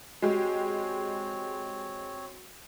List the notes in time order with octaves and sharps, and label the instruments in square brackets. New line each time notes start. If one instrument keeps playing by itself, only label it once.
[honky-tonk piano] G#3 G4 [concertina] C4 C#5 [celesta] F#4